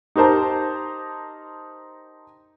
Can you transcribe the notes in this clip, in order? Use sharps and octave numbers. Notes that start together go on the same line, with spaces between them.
D#4 G4 A#4 C5 A5 A#5